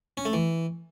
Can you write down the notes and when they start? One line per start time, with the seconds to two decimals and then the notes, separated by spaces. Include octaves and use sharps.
0.17 C#4
0.25 A3
0.33 E3